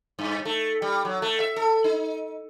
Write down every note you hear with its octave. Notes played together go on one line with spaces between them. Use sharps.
G2
A3
G3
F#3
A3
E5
A4
D#4